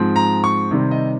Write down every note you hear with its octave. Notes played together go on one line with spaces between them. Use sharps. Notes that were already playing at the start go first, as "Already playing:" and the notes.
Already playing: G#2 F3 C4
A#5
C#6
C3 D#3 G3 C4
D#5